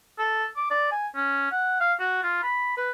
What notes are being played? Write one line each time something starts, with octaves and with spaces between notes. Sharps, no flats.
A4
D6
D5
G#5
C#4
F#5
F5
F#4
F4
B5
B4